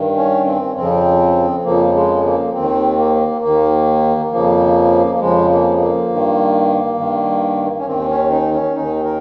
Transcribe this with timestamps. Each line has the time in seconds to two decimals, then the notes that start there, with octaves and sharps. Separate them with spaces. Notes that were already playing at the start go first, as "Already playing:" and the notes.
Already playing: G2 D#3
0.16 C#4
0.46 C4
0.76 F2 C#3 F3 C4
1.64 F2 C#3 F3 A#3
1.94 G#3
2.23 A#3
2.53 D#2 D#3 C4
2.97 A#3
3.42 D#2 D#3 A#3
4.31 F2 C#3 F3 A#3
5.15 A#3
5.19 F2 C#3 F3 G#3
5.49 A#3
5.79 A#3
6.09 G2 D#3
6.97 G2 D#3
7.78 C#4
7.86 D#2 D#3 C4
8.08 C#4
8.30 D#4
8.52 C#4
8.75 D#2 D#3 D#4
9.04 A#4